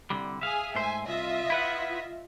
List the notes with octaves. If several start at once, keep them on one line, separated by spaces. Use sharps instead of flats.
C2 D3 G3
G#4 E5 F5 G#5
G#2 A3 C5 E5 G#5
C2 F4 D#5 E5
E4 B4 F#5